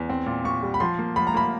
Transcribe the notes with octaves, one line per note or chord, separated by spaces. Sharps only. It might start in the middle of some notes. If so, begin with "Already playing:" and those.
Already playing: E2
C4
A#2
A#2 C#6
G3
B5
F3 C6
A#3
F3 B5
A#5
A#3 B5